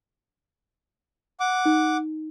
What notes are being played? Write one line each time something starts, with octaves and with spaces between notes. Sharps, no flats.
F#5 D6
D#4